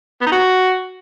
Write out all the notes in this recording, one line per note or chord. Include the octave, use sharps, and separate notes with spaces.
B3
D#4
F#4